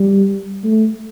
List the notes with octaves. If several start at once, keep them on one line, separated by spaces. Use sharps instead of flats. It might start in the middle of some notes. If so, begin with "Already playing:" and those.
Already playing: G3
A3